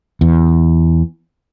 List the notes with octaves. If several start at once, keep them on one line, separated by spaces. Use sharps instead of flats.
E2